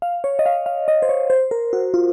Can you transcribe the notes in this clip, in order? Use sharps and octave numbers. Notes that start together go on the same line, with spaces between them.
F5
C#5
D#5
F5
F5
D#5
C5
C#5
C5
A#4
F#4
F4